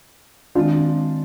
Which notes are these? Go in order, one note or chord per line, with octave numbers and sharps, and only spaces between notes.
D#3 G#3 C4 D4 F4